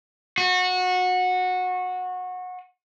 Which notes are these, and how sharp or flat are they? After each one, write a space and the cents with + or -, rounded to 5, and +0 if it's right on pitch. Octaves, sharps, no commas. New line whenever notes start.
F#4 -20